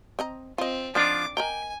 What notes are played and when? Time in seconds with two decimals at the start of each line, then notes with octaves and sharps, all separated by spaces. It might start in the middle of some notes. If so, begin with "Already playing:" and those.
0.19 C4 D#5 A#5
0.58 C4 F4 D#5
0.95 D3 F3 C4 D4 D#4 F4 D6
1.37 A#4 D#5 G5 G#5 A#5